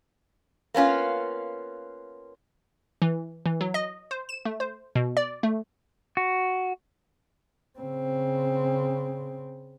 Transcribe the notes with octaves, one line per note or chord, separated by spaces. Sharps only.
A#3 B3 C#4 F4
E3
E3
F#3
D#5
C5
E7
A3
C5
B2
D5
A3
F#4
C#3 C4